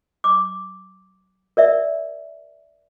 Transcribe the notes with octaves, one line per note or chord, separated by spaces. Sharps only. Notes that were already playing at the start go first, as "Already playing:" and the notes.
D6
A#4 D5 E5